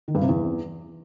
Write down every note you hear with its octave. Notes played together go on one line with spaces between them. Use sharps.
D#3
G2
C3
E2